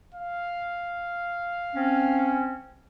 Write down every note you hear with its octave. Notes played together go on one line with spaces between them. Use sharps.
F5
C4 C#4